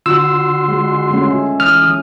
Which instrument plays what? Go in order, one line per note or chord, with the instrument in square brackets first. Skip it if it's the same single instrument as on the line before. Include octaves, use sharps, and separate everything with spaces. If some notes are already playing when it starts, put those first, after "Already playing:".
[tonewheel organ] D3 F#4 C6 [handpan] F4 [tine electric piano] E6
[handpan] G#3
G#3 A3 C#4
[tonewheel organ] E3 D#6 [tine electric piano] F6